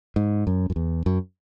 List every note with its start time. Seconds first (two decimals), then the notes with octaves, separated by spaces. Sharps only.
0.16 G#2
0.47 F#2
0.70 F#2
0.76 E2
1.06 F#2